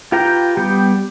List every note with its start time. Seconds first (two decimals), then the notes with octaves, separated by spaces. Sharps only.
0.12 F4 G4 B4 G5 A#5
0.57 G3 B3 G4 G5